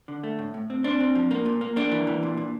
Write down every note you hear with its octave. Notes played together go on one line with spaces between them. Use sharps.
D3
A3
A2
A2
C4
C4 D4
C4
F3
A#3
A#2
A#3
A#3 D4
E3
E3
A#2
A#2